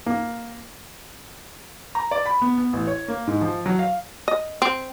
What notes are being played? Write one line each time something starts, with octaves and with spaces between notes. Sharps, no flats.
A#3
A#5
D5
B5
B3
B3
A1
C#5
A#3
G#2
F3
F#3
F5
D#5
C4